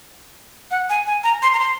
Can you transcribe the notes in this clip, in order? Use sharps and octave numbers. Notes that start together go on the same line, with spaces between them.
F#5
G#5
G#5
A#5
C6
A#5
C6